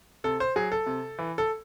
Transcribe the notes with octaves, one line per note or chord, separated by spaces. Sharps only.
C3 A4
C5
F#3 G#4
A4
C3
E3
A4